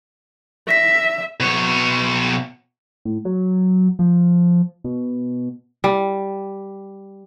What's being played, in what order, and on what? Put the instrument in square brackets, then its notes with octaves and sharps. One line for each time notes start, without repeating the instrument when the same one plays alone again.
[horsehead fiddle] E5 [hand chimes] A#6 B6
[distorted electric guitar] B2 C#5
[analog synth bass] A2
F#3
F3
B2
[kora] G3